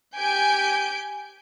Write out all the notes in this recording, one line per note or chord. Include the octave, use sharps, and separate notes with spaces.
G4 G#5 G6 D7